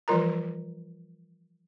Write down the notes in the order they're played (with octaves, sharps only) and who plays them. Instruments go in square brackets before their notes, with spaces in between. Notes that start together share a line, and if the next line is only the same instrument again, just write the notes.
[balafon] E3 F3 G3 F4 A#4 A#5